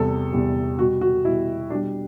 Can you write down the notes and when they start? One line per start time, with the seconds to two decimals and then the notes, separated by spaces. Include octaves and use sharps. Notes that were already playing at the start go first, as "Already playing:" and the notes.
Already playing: E2 C3 G3 A4
0.32 E2 C3 G3
0.78 B2 G3 F#4
1.01 F#4
1.24 B2 G3 E4
1.70 B2 G3 D4